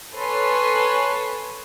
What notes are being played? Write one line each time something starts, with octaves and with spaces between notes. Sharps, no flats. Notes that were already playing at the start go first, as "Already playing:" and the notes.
A4 B4 C#5 G#5 A5 C6